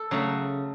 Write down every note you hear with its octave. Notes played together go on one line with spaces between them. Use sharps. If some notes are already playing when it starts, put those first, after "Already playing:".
Already playing: A4
C#3 F#3 A3